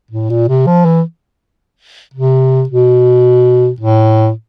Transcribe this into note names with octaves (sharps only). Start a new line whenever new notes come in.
A2
A#2
C3
F3
E3
C3
B2
A2